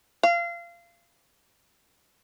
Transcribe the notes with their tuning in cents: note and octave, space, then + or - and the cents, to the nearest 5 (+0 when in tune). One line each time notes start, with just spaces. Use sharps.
F5 -25